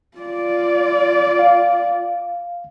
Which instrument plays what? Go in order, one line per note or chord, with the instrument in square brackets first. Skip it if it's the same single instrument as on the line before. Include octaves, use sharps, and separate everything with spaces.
[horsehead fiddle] F4 D5
[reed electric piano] F5